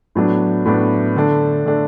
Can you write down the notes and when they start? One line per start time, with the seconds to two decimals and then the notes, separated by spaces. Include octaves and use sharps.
0.15 A2 F#3 B3 D4
0.65 A2 F#3 B3 D4
1.16 D3 A3 D4
1.66 D3 A3 D4